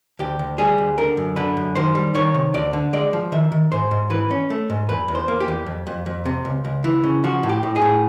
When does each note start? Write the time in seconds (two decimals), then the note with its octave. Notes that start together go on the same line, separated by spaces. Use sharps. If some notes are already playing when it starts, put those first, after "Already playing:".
0.19 D2 G4
0.39 D2
0.58 G3 G#4
0.78 D2
0.98 D3 A#4
1.17 F#2
1.36 D3 B4
1.57 F#2
1.75 D#3 C5
1.95 G3
2.15 D#3 C#5
2.34 C3
2.54 D2 D5
2.73 D3
2.93 G#3 D5
3.13 F3
3.32 D#3 E5
3.52 D#3
3.72 G#2 C5
3.91 G#2
4.10 E3 B4
4.31 C#4
4.50 A3
4.70 G#2
4.89 E2 B4
5.08 E2
5.15 C5
5.28 A#3
5.40 G4
5.48 E2
5.66 F2
5.87 F2
6.06 F2
6.25 C3
6.45 C#2
6.65 C#2
6.84 E3
7.04 C#3
7.24 F3 F#4
7.43 A2
7.49 G4
7.63 A2
7.76 G#4
7.82 A2